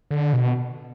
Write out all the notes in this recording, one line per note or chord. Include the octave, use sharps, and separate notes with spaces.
D3
B2